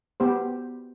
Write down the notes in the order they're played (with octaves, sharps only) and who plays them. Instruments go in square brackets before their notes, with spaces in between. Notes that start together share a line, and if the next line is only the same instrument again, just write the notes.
[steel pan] B3 G4 C5